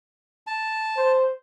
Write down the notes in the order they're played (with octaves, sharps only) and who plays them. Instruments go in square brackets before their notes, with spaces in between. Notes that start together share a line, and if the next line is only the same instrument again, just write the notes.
[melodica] A5
[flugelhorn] C5